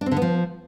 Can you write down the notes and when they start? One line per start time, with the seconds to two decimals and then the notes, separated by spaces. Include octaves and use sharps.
0.01 D4
0.06 C4
0.11 D3
0.17 B3
0.22 F3